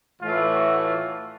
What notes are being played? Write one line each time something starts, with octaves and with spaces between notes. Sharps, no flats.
A2 E3 A3 F4
F#4
F4